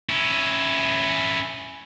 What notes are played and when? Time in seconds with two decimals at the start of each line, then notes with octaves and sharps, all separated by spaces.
0.09 C#4 E4